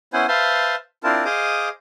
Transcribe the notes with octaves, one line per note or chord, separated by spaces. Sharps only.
B3 C#4 E4 C5 F#5 G#5
B4 C5 E5 F5 A5 C6
C4 D4 E4 F4 A#4 A5
G#4 C5 D#5 F5 D6 D#6